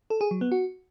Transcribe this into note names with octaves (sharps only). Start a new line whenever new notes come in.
A4
G#4
F#3
B3
F#4